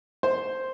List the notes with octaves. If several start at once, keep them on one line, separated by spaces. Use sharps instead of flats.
C5